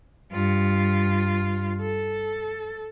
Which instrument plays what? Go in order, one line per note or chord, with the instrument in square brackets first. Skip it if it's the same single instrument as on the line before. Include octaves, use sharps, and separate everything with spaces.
[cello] G2 F4
A4